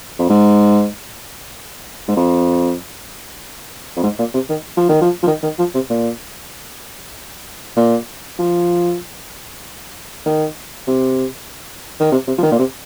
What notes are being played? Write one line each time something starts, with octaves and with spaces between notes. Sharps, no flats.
F2
G#2
G#2
F2
F2
G#2
A#2
C3
D#3
F3
D#3
F3
F3
D#3
D#3
F3
C3
A#2
A#2
F3
D#3
C3
D#3
C3
C3
F3
D#3
A#2
C3